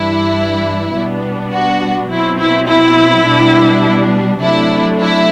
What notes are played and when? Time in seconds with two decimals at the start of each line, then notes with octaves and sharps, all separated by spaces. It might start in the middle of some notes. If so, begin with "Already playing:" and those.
Already playing: G2 E3 G3 D4 E4
0.93 B2 G3 B3 D4
1.52 F#4
2.09 B2 F#3 C4 E4
2.38 E4
2.67 E4
3.25 B2 G3 D4
4.41 C3 F#3 A3 D4 E4
5.00 E4